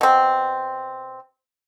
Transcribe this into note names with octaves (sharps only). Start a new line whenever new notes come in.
B2 C4